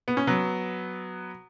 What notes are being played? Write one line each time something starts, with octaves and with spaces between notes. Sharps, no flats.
B3
C#4
F#3 B3